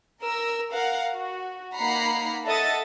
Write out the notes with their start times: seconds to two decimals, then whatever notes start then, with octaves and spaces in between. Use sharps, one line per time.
0.21 A#4 E6
0.71 A#4 F5 F#5
1.14 F#4
1.76 A#3 D#4 F#5 A#5 B5 C7
2.46 A4 D#5 E5 F#5 D#6 A6